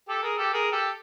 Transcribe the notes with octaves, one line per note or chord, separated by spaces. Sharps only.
G4 A4
G#4 A#4
G4 A4
G#4 A#4
G4 A4